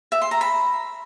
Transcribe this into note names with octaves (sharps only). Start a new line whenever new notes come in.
E5
C6
A#5
B5